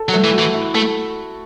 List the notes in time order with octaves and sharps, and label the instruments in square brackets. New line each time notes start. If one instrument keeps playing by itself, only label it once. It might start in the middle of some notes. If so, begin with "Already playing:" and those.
Already playing: [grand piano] A4
[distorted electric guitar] F#3
[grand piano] A3
[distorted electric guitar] E3
[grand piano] F#4
[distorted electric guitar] E3
[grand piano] E4
[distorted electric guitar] A3 [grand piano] A4